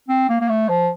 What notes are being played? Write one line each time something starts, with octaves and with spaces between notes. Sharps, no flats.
C4
A#3
A#3
A3
F3